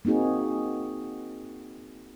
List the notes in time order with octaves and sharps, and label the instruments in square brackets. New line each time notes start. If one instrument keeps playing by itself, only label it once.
[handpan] A#3 C4 D#4 F#4 G#4